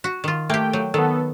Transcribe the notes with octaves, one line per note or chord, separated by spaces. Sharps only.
F#4
D#3 F4
A3 A#3 G4 G5
F#3
D#3 B3 A4